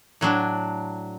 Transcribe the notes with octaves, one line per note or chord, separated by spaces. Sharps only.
A2 F#3 D4